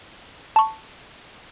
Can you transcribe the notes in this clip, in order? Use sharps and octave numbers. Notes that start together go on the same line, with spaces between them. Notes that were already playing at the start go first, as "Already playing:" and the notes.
A5 C#6